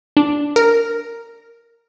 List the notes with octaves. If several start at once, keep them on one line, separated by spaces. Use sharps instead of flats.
D4
A#4